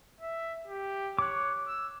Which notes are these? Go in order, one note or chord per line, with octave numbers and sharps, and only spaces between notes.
E5
G4
C#5 D6 F#6
E6